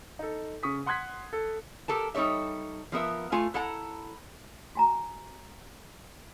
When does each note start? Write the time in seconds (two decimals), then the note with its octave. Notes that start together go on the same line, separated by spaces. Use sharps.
0.19 D#4 A4
0.63 C#3 C#6 D#6 B6
0.86 F#5 C6 D#6 F#6 G#6 B6
1.33 A4
1.88 G4 A4 A#4 A5
2.14 G3 D#4 A4 C#5 E5
2.92 F3 B3 A#4 E5
3.32 A3 F4 G#5
3.54 E4 A4 F#5 A5 A#5
4.75 F#4 G#5 A#5